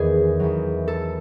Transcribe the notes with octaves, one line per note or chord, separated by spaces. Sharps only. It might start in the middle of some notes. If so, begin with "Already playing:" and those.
Already playing: E2 D#3 G#4
E2 D#3 F#3
A4